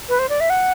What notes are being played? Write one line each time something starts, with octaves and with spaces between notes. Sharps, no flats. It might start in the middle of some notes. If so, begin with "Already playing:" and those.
B4
C5
D5
E5
F#5